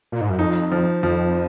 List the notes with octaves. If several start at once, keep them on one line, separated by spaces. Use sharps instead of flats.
A#2
G#2
F#2
F2 D#4
F3
F2 F3